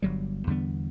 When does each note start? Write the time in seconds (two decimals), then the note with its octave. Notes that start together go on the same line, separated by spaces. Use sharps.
0.02 G1 F#3 G3
0.47 E2 D3 G3 B3